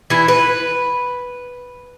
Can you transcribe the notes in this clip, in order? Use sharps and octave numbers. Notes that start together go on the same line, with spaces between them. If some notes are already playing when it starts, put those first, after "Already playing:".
E3 E4
B4